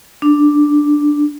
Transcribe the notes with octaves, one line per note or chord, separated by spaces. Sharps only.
D4